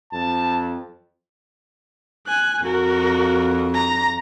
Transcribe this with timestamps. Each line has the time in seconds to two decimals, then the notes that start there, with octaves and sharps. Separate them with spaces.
0.13 F2 A5
2.26 G#5 F#6
2.63 F2 F#4 A#4
3.75 A#5